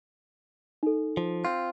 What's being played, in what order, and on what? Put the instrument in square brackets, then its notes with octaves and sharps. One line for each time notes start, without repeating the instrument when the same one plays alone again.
[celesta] D#4 A4
[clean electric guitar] F3
C4 F4